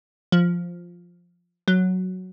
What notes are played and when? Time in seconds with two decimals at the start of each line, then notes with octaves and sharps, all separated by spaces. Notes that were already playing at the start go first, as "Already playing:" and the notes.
0.32 F3
1.68 F#3